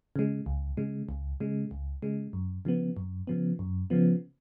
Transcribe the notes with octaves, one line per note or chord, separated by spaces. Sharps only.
C#3 G#3
C#2
C#3 G#3
C#2
C#3 G#3
C#2
C#3 G#3
F#2
C#3 F3 B3
F#2
C#3 F3 B3
F#2
C#3 F3 B3